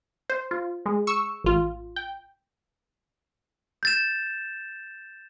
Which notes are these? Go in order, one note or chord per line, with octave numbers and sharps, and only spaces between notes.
C5
F4
G#3
C#6 E6 C#7
A1 F4
G5
G6 A6 E7